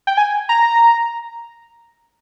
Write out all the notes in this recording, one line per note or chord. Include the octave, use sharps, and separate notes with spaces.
G5
G#5
A#5